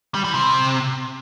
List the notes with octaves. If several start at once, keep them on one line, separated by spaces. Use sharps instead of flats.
G3
E3
C3